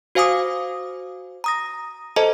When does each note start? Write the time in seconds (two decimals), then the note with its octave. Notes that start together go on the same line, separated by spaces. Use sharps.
0.15 F#4 C5 F5 G#5 D6 D#6
1.44 A#5 D#6 A#6
2.16 A4 C5 D#5 A5 A#5